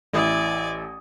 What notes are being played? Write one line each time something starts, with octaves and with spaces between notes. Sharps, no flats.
A1 E4 D5 G#5 D#6